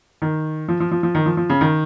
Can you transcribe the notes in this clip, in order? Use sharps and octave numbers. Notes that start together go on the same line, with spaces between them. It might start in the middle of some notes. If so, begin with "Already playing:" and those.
D#3
F3
F3
F3
F3
D#3
F3
F3
C#3
D#3